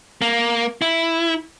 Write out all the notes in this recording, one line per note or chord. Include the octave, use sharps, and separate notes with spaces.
A#3
E4